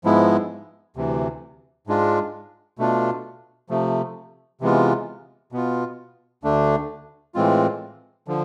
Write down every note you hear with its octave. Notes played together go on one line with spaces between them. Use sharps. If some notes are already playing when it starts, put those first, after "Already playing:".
G#2 F3 G#3 B3 E4
D2 C3 E3
G#2 G#3 D4 F4
B2 A3 D4 F4
C3 F3 A3
C3 E3 G#3 B3 F4
B2 B3 F4
D2 D3 A3 D4
A2 E3 G#3 C4 F4
D3 F3